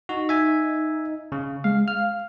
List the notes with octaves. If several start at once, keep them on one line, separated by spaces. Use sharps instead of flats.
D#4 F#4
E5 G#5
C#3
G#3 F5
F5 F6